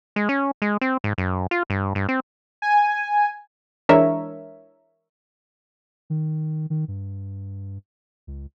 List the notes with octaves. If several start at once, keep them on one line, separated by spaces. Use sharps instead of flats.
G#3
C#4
G#3
C4
G#2
F#2
F4
G2
G2
C4
G#5
E3 G#3 D4 A#4 C#5 E5
D#3
D#3
G2
C#2